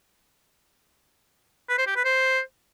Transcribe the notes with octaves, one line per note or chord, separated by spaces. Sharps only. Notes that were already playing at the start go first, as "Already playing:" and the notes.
B4
C5
G4
B4
C5